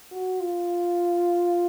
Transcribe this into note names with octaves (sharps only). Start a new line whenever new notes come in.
F#4
F4